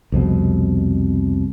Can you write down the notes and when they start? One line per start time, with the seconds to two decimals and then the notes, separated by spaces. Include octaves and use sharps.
0.12 C2 F2 B2